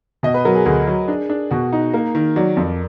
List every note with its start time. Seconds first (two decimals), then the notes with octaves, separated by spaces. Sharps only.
0.23 B2 D#5
0.34 B4
0.45 F#3 A#4
0.55 G#4
0.65 D2 G#4
0.87 F#3
1.08 D4
1.30 D4
1.51 B2 F#4
1.72 D#4
1.94 A#3 A#4
2.15 D#3
2.36 F#3 D5
2.57 F2